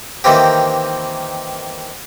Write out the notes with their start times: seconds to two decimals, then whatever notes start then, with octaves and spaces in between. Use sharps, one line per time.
0.24 D#3 E3 A#3 C4 G4